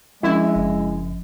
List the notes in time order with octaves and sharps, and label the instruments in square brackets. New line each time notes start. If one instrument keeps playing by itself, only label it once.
[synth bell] F3 C#4 [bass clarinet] G#3 [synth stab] E4
[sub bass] F#1